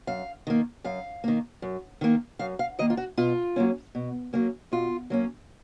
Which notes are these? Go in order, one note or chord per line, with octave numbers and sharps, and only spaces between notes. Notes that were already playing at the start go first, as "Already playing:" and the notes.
F#2 F5
D#3 A#3
F#2 F5
D#3 A#3
F#2
D#3 A#3
F#2 F5
F5
D#3 A#3 D#5
F4
F#4
B2 F4
F#3 A#3 C#4
B2
F#3 A#3 C#4
B2 F4
F#3 A#3 C#4